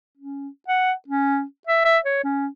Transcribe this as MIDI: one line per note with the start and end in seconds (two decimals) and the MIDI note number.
0.18 0.48 61
0.68 0.92 78
1.08 1.44 61
1.67 1.81 76
1.85 1.98 76
2.05 2.22 73
2.24 2.47 61